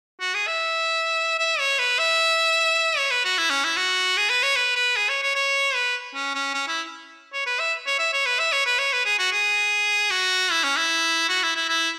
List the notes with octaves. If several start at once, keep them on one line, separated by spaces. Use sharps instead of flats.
F#4
G#4
E5
E5
C#5
B4
E5
C#5
B4
F#4
E4
C#4
E4
F#4
G#4
B4
C#5
B4
B4
G#4
C#5
C#5
C#5
B4
C#4
C#4
C#4
E4
C#5
B4
E5
C#5
E5
C#5
B4
E5
C#5
B4
C#5
B4
G#4
F#4
G#4
F#4
E4
C#4
E4
F#4
E4
E4
E4